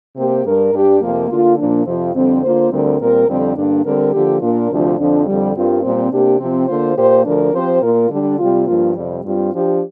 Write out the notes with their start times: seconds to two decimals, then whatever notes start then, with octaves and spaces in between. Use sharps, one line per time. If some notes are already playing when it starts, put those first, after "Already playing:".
0.15 C3 A#3 G4 C5
0.44 G2 G3 D4 A#4
0.72 G2 G3 D4 G4
1.01 F2 C3 F3 A#3
1.29 D3 A#3 F4
1.57 A#2 F3 A#3 D4
1.85 F2 C3 F3 C4 F4
2.14 F2 D3 G3 C4
2.42 D3 A#3 F4 C5
2.70 D2 D3 G3 C4 A#4
3.00 A#2 G3 C4 A#4
3.27 F2 D3 G3 C4
3.55 G2 D3 A#3 D4
3.85 D3 G3 C4 A#4
4.12 D3 F3 A#3 G4
4.40 A#2 A#3 D4 F4 A#4
4.69 D2 C3 F3 D4
4.98 F2 D3 F3 D4
5.26 F2 D3 G3
5.54 G2 G3 C4 F4 A#4
5.82 A#2 G3 C4
6.11 C3 A#3 D4 G4
6.39 C3 F3 C4
6.67 D3 A#3 F4 C5
6.96 A#2 A#3 G4 C5
7.24 D2 D3 F3 D4 A#4
7.52 F3 C4 G4 C5
7.81 A#2 A#3 F4 A#4
8.09 D3 G3 D4
8.38 C3 G3 C4 F4
8.66 G2 F3 A#3 F4
8.95 F2 C3 G3
9.23 G2 G3 C4 F4
9.52 F3 D4 G4